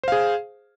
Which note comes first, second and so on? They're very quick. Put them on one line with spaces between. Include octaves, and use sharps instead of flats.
C5 F5 G#4